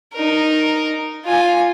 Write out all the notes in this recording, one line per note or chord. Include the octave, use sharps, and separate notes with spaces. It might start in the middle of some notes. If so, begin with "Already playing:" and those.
D#4 A#4
F4 G#5